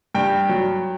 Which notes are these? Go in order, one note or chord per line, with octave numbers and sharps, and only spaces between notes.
G2 G5
F#3